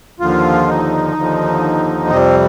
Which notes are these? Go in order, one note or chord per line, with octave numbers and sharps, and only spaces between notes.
D#2 D3 F3 F4
D#4
D#2 D3 F3
F2 C3 G3 C4